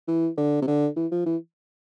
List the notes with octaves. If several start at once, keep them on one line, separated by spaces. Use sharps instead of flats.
E3
D3
C3
D3
E3
F3
E3